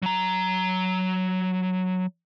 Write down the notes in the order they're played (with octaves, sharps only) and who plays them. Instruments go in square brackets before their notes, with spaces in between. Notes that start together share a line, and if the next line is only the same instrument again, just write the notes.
[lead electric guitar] F#3 A#5